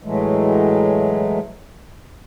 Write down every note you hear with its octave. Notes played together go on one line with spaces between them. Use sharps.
A2 E3 F#3 G#3 A3